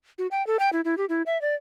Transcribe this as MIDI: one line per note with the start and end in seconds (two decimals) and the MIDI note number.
0.18 0.27 66
0.31 0.45 79
0.47 0.57 69
0.59 0.70 79
0.73 0.81 64
0.85 0.97 64
0.98 1.05 67
1.09 1.22 64
1.26 1.40 76
1.41 1.55 74